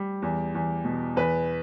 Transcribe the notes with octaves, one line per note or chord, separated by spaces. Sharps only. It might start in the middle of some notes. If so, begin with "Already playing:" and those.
Already playing: G3
E2
E2
B2
E2 B4